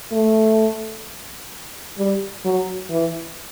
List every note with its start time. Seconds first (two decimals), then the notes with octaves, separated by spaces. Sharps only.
0.12 A3
1.98 G3
2.45 F#3
2.90 E3